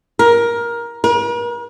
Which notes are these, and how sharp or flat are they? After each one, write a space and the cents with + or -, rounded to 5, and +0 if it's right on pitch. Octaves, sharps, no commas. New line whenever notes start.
A#4 +15
A#4 +45